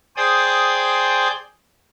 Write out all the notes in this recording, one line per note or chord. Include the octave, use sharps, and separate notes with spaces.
G#4 C5 D5 G5 D#6 G6